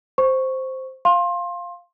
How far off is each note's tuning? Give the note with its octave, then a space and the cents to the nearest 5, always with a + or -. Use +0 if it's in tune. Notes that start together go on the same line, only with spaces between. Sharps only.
C5 +0 C#6 -5
F5 +0 C6 +25